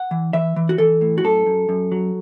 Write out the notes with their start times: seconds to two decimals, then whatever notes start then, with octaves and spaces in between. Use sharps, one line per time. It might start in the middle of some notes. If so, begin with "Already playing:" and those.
Already playing: F#5
0.11 E3
0.33 E3 E5
0.56 E3
0.69 F#4
0.78 E3 A4
1.01 A2
1.18 F#4
1.24 F#2 A4
1.46 F#2
1.69 F#2
1.92 F#3